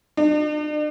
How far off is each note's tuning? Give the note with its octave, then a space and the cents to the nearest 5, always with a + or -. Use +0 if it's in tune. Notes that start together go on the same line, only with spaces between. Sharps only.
D4 +45